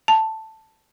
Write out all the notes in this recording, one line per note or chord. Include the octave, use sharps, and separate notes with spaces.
A5